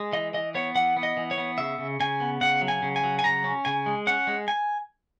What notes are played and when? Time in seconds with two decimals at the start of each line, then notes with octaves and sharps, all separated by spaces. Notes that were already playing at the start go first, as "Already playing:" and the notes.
Already playing: G#3
0.13 E3 D#5
0.34 E3 D#5
0.55 B3 C#5
0.75 E3 F#5
0.97 B3
1.03 D#5
1.17 E3
1.31 C#5
1.38 B3
1.58 C#3 E5
1.78 C#3
2.00 C#3 G#5
2.20 B3
2.41 C#3 F#5
2.61 F#3
2.68 G#5
2.82 C#3
2.96 G#5
3.03 F#3
3.19 G#5
3.24 C#3 A#5
3.44 C#4
3.65 C#3 G#5
3.86 G#3
4.07 C#4 F#5
4.27 G#3
4.48 G#5